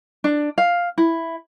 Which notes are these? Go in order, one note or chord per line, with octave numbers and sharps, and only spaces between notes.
D4
F5
E4